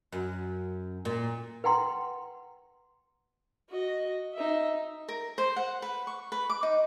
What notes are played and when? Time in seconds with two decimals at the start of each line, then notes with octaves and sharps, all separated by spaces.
0.12 F#2
1.05 A#2
1.64 B4 F#5 G5 A#5 C6
3.69 F#4 D#5
4.33 D#4 E5
5.08 A#4
5.38 C5
5.56 F#5
5.82 B4
6.07 C#6
6.32 B4
6.50 D6
6.63 D#4